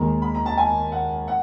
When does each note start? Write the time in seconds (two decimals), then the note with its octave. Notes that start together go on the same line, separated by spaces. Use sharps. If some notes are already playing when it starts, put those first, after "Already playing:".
Already playing: D#2 D#3 G#3 A#5
0.22 B5
0.35 A#5
0.46 A5
0.57 G#5
0.92 F#5
1.28 F#5